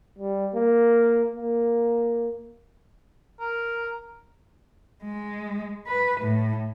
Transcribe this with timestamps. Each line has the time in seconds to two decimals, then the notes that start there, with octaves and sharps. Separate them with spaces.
0.18 G3
0.54 A#3
1.35 A#3
3.40 A#4
5.04 G#3
5.87 B4
6.20 A2